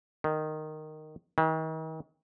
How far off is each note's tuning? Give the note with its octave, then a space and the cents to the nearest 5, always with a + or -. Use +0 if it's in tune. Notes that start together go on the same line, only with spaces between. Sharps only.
D#3 -10
D#3 +40